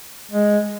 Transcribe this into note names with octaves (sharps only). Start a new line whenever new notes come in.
G#3